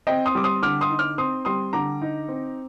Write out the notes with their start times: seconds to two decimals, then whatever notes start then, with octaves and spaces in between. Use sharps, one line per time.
0.07 C4 D#5 G5
0.25 C6 D#6
0.35 G3 D6
0.44 C6 D#6
0.62 D3 D6 F6
0.81 C6 D#6
0.90 D#4
0.99 D6 F6
1.18 C4 C6 D#6
1.45 G3 C6 D#6
1.73 D3 A#5 D6
2.02 D#4
2.28 C4